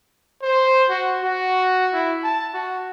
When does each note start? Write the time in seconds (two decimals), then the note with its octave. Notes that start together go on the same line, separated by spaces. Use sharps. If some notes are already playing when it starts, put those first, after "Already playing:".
0.42 C5
0.90 F#4
1.23 F#4
1.94 E4
2.23 A5
2.54 F#4